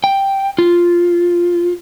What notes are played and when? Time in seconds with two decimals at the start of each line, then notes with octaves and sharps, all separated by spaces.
0.04 G5
0.58 F4